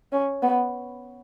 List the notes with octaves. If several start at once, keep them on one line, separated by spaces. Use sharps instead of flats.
C#4
B3